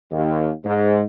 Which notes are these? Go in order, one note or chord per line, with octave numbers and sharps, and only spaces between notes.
D#2
G#2